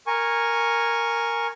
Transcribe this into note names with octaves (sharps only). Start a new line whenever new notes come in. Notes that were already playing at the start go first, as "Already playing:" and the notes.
A#4 G#5 C#6